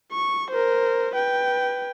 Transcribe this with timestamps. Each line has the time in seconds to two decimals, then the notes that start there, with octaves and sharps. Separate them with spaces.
0.12 C#6
0.51 A#4 C5
1.15 B4 G5